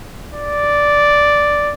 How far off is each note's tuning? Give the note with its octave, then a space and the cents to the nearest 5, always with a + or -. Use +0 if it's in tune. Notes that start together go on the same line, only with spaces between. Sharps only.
D5 -5